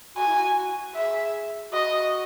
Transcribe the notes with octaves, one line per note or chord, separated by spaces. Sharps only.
F#4 G#5
E4
F#4
G#4 E5
F#4 D#5